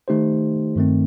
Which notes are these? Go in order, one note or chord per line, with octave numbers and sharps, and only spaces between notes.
D#3 A3 D#4 G4 C5
G2 D#3 A3 C4